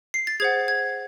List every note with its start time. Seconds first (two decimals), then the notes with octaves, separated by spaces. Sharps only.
0.14 C7
0.27 A6
0.40 G#4 C5 F#5 G#6
0.68 G#6